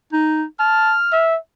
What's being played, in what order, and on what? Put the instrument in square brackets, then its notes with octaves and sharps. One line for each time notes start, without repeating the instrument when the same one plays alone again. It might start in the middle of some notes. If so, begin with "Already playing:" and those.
[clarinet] D#4
[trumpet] A5 [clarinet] F6
[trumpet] E5